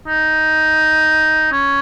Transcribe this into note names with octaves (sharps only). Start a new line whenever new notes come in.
D#4
C#4